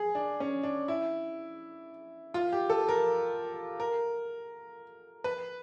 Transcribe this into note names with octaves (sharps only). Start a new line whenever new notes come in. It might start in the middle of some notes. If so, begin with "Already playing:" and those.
Already playing: G#4
D4
C#4
D4
E4
F4
G4
A4
A#4
A#4
B4